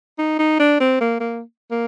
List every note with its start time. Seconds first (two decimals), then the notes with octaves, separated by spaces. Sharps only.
0.19 D#4
0.39 D#4
0.59 D4
0.80 C4
1.01 A#3
1.20 A#3
1.71 A#3